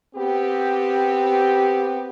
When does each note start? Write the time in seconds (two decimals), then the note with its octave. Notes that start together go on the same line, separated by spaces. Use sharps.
0.15 B3 C4 G4